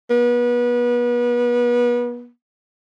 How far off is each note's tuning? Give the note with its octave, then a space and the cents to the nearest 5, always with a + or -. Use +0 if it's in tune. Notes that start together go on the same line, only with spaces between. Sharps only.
B3 -30